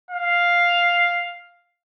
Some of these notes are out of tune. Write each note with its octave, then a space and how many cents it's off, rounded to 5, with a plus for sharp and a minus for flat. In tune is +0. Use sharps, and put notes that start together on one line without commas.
F5 +0